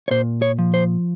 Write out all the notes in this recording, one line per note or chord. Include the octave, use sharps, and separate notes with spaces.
C#5
A#2 C5
C#5
F3
C5